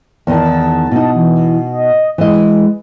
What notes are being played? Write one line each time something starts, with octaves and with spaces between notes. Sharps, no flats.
E2 D#3 A5
B2 D#4
E3
D#5
E3 G#3 D#5